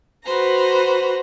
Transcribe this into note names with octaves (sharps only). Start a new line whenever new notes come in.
F#4 B4 C5 A#5